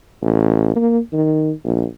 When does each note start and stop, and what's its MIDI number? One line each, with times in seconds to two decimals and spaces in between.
0.22 0.73 33
0.76 0.99 58
1.13 1.51 51
1.64 1.85 34